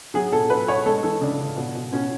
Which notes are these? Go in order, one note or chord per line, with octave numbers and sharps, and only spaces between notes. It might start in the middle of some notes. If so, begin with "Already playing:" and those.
F#3 G#4
B2 A4
B2 B4
B2 C#5
G#3 A4
E3 A4
C#3 D4
C#3
B2
B2
B2 C#4